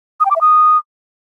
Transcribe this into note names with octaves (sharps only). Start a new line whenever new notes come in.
D#6
G5
D6
E5
D#6